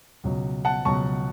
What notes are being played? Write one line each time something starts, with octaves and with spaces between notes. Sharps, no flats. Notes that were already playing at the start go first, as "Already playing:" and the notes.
C#2 B2 F#3
F#5 A5
C#2 B2 F#3 A5 C#6